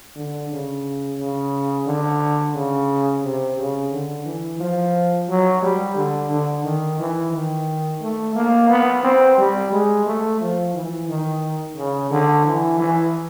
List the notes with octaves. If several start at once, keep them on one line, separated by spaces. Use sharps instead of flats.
D3
C#3
C#3
D3
C#3
C3
C#3
D3
E3
F3
F#3
G3
D3
D3
D#3
E3
D#3
A3
A#3
B3
C4
G3
G#3
A3
F3
E3
D#3
C#3
D3
E3
E3